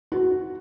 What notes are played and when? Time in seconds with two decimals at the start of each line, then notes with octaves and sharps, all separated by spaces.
0.12 F#4